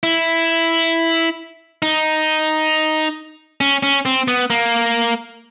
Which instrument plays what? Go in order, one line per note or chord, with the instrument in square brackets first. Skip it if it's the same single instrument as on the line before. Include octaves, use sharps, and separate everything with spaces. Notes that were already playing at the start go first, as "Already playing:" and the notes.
[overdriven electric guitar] E4
D#4
C#4
C#4
C4
B3
A#3